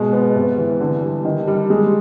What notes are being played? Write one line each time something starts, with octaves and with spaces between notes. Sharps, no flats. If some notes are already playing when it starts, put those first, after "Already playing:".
Already playing: B2 G#3
B3
C3
E3
D3
G3
D#3
G3
G#3